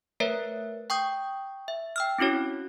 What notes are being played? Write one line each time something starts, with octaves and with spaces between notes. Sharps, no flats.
A3 A#4 B4 C#5 E5
G5 C#6 D#6 G6
E5
G5 E6 F6
C4 C#4 E4 F#4 C#5